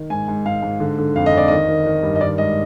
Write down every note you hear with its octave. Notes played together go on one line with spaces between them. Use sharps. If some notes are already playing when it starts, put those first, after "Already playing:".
Already playing: D#3
G#2 G#5
G#2
G#2 F5
G#2
D3
D3
F2 F5
D#5
F2 D5
D#3 D#5
D#3
D#3
G2
D#5
D#3 D5
G#2 D#5